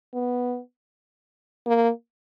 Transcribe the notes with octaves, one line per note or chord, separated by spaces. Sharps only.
B3
A#3